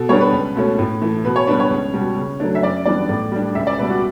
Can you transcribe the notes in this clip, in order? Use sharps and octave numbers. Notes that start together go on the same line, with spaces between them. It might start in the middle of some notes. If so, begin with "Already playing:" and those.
Already playing: B2 A4
G3 B3 D4 C#5
B4
C#2
B2 A3 C#4
A2
E3 A3
B2 B4
C#5
G3 B3 D4 B4
C#5
C#2
B2 G3
C#3
F#3 A3 D4
E5
F#2 D5
E3 G3 B3 D4 D5
A2
G3 D4
C#2 E5
D5
B2 G3 B4
F#4